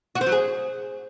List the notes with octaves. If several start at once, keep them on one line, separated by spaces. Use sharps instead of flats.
F#4
C4
F#3
G#4